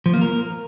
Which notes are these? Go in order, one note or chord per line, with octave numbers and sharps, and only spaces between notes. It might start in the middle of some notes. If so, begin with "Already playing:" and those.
F3
A#3
A#4